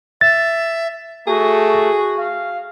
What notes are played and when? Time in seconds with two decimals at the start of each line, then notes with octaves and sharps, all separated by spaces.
0.21 E5 A6
1.27 A3 F#4 G#4
2.18 F5